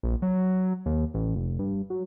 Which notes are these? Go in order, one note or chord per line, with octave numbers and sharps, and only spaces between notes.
A#1
F#3
D#2
A1
F1
G2
F#3